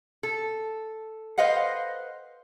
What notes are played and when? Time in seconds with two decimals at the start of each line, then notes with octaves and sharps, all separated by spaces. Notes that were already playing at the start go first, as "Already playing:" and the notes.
0.23 A4
1.38 B4 C5 D#5 F5 F#5